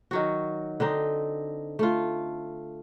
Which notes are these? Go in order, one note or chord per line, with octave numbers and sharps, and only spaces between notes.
D#3 F#3 F#4
D3 C4 D#4
A3 F4